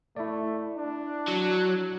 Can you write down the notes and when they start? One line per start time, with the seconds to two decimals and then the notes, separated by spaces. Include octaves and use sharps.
0.16 A3 E4 D5
0.77 D4
1.28 F#3